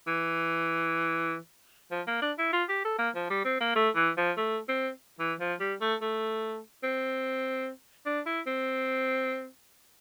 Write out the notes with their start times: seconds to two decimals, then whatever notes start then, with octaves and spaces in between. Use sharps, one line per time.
0.07 E3
1.91 F3
2.07 A#3
2.22 D4
2.39 E4
2.53 F4
2.69 G4
2.85 A4
2.99 A#3
3.15 F3
3.30 G3
3.45 C4
3.61 A#3
3.76 A3
3.96 E3
4.17 F3
4.37 A3
4.69 C4
5.20 E3
5.40 F3
5.60 G3
5.81 A3
6.01 A3
6.83 C4
8.06 D4
8.26 E4
8.47 C4